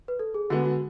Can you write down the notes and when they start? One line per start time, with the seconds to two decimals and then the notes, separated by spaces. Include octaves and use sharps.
0.08 B4
0.19 A4
0.34 G#4
0.50 D3 G#3 B3 F#4
0.66 F#4